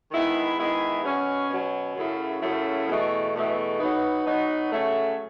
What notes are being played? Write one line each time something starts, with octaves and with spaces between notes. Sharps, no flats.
D#3 G#3 B3 E4
D#3 G#3 B3 E4
B2 F#3 C#4
B2 F#3 C#4
F#2 C#3 F#3 A3 E4
F#2 C#3 F#3 A3 E4
E2 B2 A3
E2 B2 A3
B2 F#3 B3 D#4
B2 F#3 B3 D#4
C#3 F#3 A3